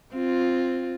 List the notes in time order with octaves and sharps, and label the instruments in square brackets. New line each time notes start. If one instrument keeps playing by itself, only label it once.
[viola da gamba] C4 F4